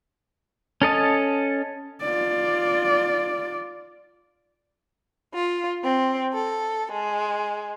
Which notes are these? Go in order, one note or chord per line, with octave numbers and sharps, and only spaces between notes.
C#4 A4 D#5 A5
F4 D5
F4
C4
A4
G#3